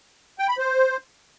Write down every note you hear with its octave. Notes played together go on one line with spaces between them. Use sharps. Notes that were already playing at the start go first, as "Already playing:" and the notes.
G5
B5
C5